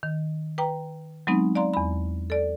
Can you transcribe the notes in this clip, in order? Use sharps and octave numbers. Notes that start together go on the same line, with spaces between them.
D#3
B4 G5 A#5
F#3 G#3 B3 C4 D#4
D5 F5 A#5 C6
E2 B5
A4 D5